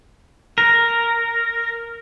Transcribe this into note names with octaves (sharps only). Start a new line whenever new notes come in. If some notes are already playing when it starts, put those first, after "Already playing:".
A#4